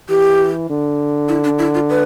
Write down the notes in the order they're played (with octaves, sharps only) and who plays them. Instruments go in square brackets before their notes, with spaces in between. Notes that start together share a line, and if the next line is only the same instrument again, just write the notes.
[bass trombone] E3 [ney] G4
[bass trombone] D3
[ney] E4
D4
E4
F4
B4